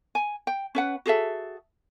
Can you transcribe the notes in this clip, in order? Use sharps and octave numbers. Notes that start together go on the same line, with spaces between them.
G#5
G5
C#4 B4 F#5
F#4 G#4 A4 E5